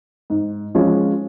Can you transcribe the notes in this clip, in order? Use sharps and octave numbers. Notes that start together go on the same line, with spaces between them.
G#2
F3 G#3 C#4 F4